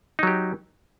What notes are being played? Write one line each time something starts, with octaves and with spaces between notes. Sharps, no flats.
F#3 D#4 G4